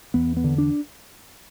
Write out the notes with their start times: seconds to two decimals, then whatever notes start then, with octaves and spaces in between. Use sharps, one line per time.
0.14 E2 B3
0.37 B3
0.44 D3
0.58 D4